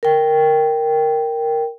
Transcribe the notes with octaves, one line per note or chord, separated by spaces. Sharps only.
A#4 G5